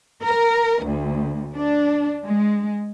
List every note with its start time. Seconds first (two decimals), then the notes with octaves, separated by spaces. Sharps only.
0.23 A#4
0.85 D2
1.56 D4
2.25 G#3